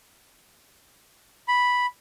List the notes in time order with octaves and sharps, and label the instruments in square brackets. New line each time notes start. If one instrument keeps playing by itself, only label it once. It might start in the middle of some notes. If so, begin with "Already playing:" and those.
[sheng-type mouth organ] B5